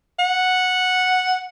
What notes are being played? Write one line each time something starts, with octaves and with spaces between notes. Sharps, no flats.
F#5